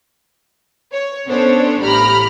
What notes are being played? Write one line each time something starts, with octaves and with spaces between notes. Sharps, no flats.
C#5
B3 C#4 D4 A4 C5 C#5
A1 A2 G4 A#5 B5 F6